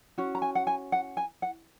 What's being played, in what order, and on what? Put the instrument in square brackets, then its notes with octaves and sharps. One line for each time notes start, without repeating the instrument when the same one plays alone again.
[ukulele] C#4 F#4
A#5
G#5
F#5
G#5
F#5
G#5
F#5